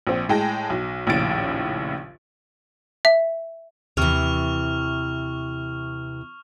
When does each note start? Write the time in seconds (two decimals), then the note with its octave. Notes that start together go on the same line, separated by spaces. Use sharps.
0.07 A#1 C4
0.29 A2 G#3 G5 A5 A#6
0.70 B1
1.07 A#1 D#2 A2 C#3 A6 D7
3.05 E5
3.97 D#2 C3 E3 C#6 F6 F7